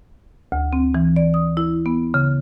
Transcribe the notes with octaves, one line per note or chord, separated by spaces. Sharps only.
D2
C4
E3
D5
D#6
E4
B3
C#3